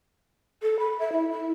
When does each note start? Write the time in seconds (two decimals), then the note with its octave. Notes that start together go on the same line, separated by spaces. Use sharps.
0.63 A4
0.79 B5
0.99 E5
1.12 E4
1.31 E4